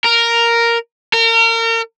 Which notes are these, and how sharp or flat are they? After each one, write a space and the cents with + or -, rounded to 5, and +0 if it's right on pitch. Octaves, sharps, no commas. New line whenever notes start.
A#4 +0
A#4 -35